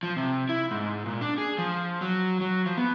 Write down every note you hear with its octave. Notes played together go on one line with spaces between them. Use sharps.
F3
C3
E4
G#2
A#2
D4
G#4
F3
F#3
F#3
F3
B3